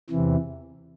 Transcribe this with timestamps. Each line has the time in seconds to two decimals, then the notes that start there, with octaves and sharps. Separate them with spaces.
0.10 E2 C3 E3